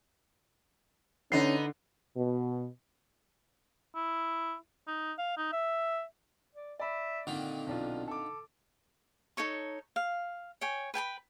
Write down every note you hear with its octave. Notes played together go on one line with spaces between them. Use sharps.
D3 B3 C#4 D#4 C7
B2
E4
D#4
F5
D#4
E5
D5
D5 E5 B5
A#2 D3 D#3 C4
B1 D4 F4
A4 D6
D#4 A4 C#5 C#6
F5
C#5 G5 G#5
B4 G5 G#5 B5